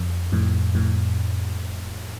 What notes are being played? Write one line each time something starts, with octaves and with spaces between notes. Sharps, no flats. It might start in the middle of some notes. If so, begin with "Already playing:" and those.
Already playing: F2
F2 A2
F2 A2